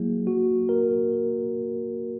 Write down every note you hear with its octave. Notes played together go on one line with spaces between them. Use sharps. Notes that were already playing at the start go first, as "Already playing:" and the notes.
Already playing: F#3 A#3 E4 G#4
F#4
A#4